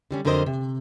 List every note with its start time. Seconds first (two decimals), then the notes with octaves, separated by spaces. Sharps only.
0.11 D3 G3 C#4
0.25 F2 D3 F#3 A#4 C5 D#5
0.46 C3